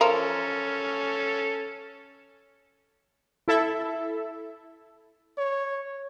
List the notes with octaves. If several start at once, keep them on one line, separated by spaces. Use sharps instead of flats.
F3 C#4 F4 A4 A#4
E4 A4 E5
C#5